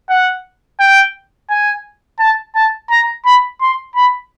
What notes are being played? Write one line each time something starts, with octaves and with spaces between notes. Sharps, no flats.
F#5
G5
G#5
A5
A5
A#5
B5
C6
B5